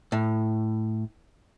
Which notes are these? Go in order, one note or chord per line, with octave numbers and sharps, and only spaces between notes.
A2